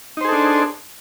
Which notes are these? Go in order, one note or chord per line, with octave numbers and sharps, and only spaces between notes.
D4 D#4 G#4 A4 C5